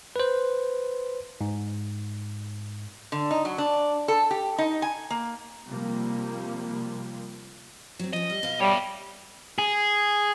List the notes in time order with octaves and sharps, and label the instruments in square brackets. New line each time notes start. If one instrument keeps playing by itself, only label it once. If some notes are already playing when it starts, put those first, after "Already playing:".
[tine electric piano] B4 C5
G#2
[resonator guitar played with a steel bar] D3
D#4
F#3
D4
A4
G4
D#4
G#5
A#3
[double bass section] C3 F3 G3 A#3
[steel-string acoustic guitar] F#3 C4
[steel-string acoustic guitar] F3 C#4 [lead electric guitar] D#5
[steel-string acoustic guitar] G3
B2 F5
[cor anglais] G3 [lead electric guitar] C#5 E5
[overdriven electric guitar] G#4